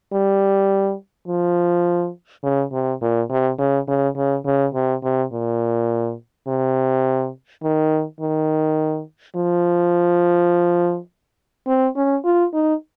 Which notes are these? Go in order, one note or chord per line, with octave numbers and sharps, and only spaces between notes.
G3
F3
C#3
C3
A#2
C3
C#3
C#3
C#3
C#3
C3
C3
A#2
C3
D#3
D#3
F3
C4
C#4
F4
D#4